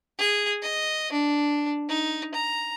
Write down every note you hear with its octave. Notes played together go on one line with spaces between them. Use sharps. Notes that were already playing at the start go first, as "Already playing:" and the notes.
G#4
D#5
D4
D#4
A#5